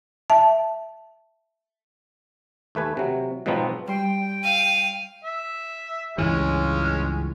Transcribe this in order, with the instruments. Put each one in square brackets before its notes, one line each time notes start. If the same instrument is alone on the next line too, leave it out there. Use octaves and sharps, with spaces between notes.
[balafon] E5 A5
[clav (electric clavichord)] D#2 A3 B4 G#5
C3 F#3
G#2 B2 F3 F#3 B3 C4
[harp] G3 C6 [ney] G5
[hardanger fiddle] F5 [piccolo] D#7
[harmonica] E5
[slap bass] C#2 G2 E3 [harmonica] G#3 C#4